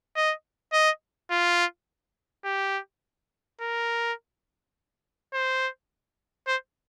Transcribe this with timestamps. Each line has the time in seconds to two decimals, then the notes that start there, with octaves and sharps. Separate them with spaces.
0.16 D#5
0.73 D#5
1.31 F4
2.45 G4
3.61 A#4
5.34 C5
6.47 C5